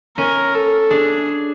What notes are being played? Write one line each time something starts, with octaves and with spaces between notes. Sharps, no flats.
C#4 A#4
A4
D4 G#4